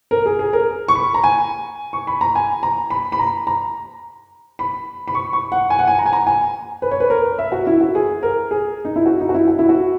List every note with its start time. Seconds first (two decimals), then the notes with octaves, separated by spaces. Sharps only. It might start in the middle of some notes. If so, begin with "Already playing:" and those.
0.11 A#4
0.26 G#4
0.39 G#4
0.53 A#4
0.88 C#6
0.95 B5
1.14 A#5
1.24 G#5
1.93 C#6
2.07 B5
2.21 A#5
2.35 G#5
2.63 A#5
2.90 B5
3.12 B5
3.19 A#5
3.47 A#5
4.59 B5
5.08 B5
5.15 C#6
5.33 C#6
5.52 F#5
5.70 G#5
5.79 F#5
5.87 G#5
5.99 A#5
6.06 G#5
6.13 A#5
6.27 G#5
6.82 B4
6.91 C#5
7.00 B4
7.10 A#4
7.39 E5
7.52 F#4
7.67 E4
7.81 F#4
7.95 G#4
8.23 A#4
8.51 G#4
8.85 D#4
8.96 E4
9.06 F#4
9.20 D#4
9.29 F#4
9.34 E4
9.48 F#4
9.59 E4
9.69 F#4